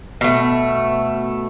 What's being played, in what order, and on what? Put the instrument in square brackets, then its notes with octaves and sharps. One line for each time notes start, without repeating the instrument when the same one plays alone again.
[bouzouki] B2 A3